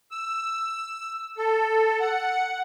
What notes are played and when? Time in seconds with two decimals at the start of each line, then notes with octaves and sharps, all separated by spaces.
0.11 E6
1.37 A4
2.00 F#5